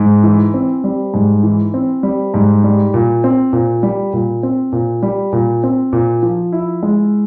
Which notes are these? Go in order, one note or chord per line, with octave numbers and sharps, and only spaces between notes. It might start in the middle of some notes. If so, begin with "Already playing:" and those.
Already playing: G#2
E3
C4
G3
G#2
E3
C4
G3
G#2
G3
A#2
C4
A#2
G3
A#2
C4
A#2
G3
A#2
C4
A#2
F3
E4
G#3